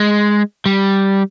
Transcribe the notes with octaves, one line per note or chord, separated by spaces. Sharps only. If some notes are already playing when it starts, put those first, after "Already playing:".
Already playing: G#3
G3